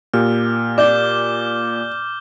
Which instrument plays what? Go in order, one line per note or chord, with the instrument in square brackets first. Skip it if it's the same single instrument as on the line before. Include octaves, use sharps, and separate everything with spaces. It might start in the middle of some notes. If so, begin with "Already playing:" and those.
[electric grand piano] A#2 G4 [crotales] F6
[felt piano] D5 [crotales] D6 G6 G7